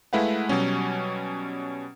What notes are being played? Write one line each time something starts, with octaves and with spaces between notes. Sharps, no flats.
G#3 A3 E4 B4 F5 F#5
B2 F#3 G3 C#4